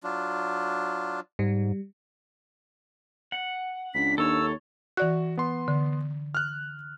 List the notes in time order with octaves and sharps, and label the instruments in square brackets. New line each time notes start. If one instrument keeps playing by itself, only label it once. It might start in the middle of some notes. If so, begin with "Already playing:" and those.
[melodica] F#3 D4 F4
[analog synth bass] G#2 [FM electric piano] G3
[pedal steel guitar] F#5
[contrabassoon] C#2 [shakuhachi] D4 [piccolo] B6
[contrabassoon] D#2 [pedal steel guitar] A4 C#5 [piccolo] E6
[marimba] E3 D5 F#6 [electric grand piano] F#4
[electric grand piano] B3 C6
[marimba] D3
[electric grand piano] F6 F#6